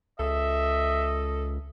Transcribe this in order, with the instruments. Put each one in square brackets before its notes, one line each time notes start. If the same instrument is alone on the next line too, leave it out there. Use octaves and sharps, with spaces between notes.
[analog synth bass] C#2 [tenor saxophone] A4 [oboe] D#5 [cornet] E5